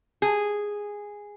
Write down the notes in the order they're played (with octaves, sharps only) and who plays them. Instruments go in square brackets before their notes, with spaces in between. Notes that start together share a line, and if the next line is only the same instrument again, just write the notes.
[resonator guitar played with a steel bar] G#4